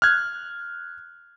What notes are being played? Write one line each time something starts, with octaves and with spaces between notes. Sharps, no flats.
F6 F#6 G#6